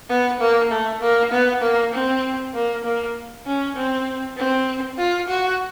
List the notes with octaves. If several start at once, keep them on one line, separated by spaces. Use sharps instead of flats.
B3
A#3
A3
A#3
B3
A#3
C4
A#3
A#3
C#4
C4
C4
F4
F#4